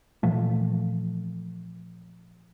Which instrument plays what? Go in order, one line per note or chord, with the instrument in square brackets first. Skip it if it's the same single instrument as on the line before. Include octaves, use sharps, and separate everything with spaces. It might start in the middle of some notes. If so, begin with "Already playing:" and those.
[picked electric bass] A#2 E3 F3 A3